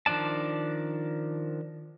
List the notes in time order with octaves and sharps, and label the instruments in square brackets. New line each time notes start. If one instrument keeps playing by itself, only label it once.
[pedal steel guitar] D#3 F3 D4 D5 A5